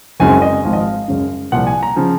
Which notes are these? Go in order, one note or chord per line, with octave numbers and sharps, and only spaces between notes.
F#1 F#2 C#3 G#3 C4 G#5
D#5
G#1 G#2 F3 C4 F5
D#5
F5
F#2 C#3 G#3 C#4
C2 A#2 F3 F#5
G#5
A#5
C#3 F3